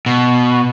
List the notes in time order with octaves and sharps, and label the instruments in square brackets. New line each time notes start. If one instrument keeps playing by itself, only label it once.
[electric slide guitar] B2